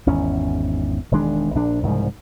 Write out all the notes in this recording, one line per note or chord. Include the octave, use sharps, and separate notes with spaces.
G#1 E2 C#4
E1 D#3 G#3 D4
A#1 D4
C2 G#2 C#3 F3